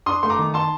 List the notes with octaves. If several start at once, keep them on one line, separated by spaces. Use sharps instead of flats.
D4 C6 D#6
A3 C6
A#5 D6
D#3
A5 C6